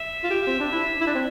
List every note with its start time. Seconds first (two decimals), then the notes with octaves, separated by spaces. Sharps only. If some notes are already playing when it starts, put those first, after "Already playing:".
Already playing: E5
0.24 F4
0.31 G4
0.47 C4
0.60 D4
0.72 E4
1.01 E4
1.07 D4
1.15 C4